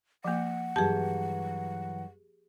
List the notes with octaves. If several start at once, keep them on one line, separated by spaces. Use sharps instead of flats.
F3 A#3 F#5
G2 E3 F#3 G4 G#4 A5